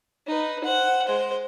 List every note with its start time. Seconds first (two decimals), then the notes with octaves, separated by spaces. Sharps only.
0.27 D#4 B4
0.64 C5 F#5
1.05 G#3 C5